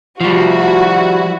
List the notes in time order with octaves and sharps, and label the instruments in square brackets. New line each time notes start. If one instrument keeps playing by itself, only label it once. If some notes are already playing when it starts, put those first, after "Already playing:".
[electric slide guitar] F3 G3 [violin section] E4 F#4